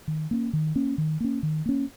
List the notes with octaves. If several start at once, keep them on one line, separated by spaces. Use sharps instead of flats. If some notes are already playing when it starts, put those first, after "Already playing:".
D#3
A#3 C#4
D#3
A#3 C#4
D#3
A#3 C#4
D#3
A#3 C#4